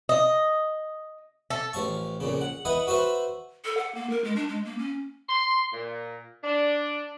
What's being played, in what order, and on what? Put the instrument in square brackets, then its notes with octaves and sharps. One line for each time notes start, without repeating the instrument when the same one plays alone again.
[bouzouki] D#5
A4
[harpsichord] A1 F3 F5 C#6
F2 A#2 C#3
F#5
E4 B4 D#5 F#5
F#4 B4 C5 E5 C6
[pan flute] A4
F#5
A#3
A#4
G#3
D4
G#3
A#3
C#4
[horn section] C6
A#2
D4